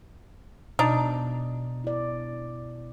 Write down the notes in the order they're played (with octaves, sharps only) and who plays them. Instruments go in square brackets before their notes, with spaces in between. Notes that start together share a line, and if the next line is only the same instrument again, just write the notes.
[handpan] B2 [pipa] D4 D#4
[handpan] E4 D5